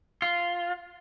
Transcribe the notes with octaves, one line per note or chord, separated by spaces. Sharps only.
F4